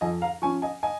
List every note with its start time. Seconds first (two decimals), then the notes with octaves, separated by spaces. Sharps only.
0.01 F2 D#5 G#5
0.22 F5 A#5
0.42 F3 C#4 G#5 C#6
0.62 D#5 G#5
0.83 D#5 G#5